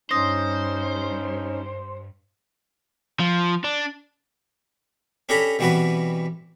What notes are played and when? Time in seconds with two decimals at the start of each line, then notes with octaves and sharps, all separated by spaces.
0.11 G2 C#4 D#4 C5 D#6 A#6
3.20 F3
3.64 D4
5.29 C#4 D4 G4 A4 A#5 B5
5.59 B2 E3 G3 C4 F#4 B4